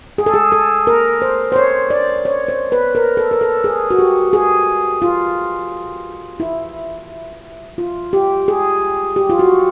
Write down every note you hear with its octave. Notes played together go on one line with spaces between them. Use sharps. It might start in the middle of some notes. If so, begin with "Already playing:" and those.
G#4
A4
G#4
A4
A#4
C5
C5
C#5
D5
C#5
C5
B4
A#4
A4
A#4
A4
G#4
F#4
G4
G#4
F4
E4
F4
G4
G#4
G4
F4
F#4